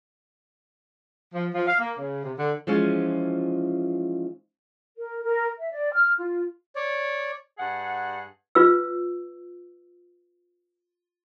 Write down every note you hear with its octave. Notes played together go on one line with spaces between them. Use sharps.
F3
F3
F5
A#3
C#3
C3
D3
E3 F3 G#3 C#4 F4
A#4
A#4
E5
D5
F6
F4
C#5 D5
G2 G#4 F#5
F4 B4 E6